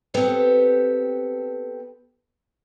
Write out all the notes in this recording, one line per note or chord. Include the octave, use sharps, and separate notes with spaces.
B3 C4 G4 A4